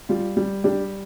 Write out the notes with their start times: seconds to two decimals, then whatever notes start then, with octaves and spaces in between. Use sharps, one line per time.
0.09 G3 F4
0.37 G3
0.64 G3 D4 G4